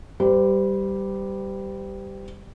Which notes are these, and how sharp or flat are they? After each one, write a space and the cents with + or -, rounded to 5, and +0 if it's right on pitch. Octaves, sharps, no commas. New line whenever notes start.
G3 -5 C5 -45